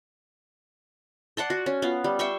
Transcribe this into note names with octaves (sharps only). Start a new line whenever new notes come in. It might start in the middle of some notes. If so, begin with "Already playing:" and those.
D5 F#5 A5 C6
F#4
C#4
B3 F4
G3
E5 G5 C6 C#6